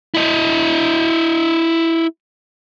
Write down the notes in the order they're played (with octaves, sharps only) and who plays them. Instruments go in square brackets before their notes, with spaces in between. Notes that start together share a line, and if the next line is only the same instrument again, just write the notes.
[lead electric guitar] E4 D#5